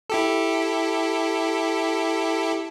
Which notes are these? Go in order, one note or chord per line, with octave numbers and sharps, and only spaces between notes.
E4 G4 A4